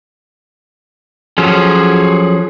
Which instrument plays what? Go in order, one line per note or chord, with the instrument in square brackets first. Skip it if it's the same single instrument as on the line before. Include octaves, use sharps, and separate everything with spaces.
[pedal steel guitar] F3 F#3 C#4 [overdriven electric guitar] G#4 A4